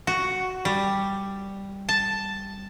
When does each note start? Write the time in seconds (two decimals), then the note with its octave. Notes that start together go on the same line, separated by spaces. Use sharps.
0.07 F#4
0.65 G3
1.89 A5